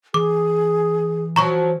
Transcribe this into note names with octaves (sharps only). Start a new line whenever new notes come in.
E3 G#4 D6
F3 F#3 A#5 C#6